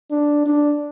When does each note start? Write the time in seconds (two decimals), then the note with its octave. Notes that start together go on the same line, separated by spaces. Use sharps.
0.11 D4
0.45 D4